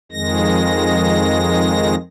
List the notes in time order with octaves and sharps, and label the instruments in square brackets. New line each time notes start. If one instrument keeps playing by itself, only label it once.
[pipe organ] F2 D#3 G#3 A#6